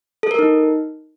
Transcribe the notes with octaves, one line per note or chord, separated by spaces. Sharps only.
A4
A#4
D#4